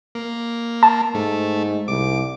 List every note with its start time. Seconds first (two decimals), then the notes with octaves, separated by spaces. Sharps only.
0.15 A#3
0.83 A5
1.15 G#2 A3
1.88 C2 D6